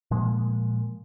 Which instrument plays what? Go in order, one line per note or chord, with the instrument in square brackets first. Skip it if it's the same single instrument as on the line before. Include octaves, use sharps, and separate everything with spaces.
[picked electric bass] A#2 F3 G#3 A#3